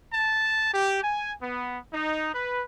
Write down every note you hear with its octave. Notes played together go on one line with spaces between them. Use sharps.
A5
G4
G#5
B3
D#4
B4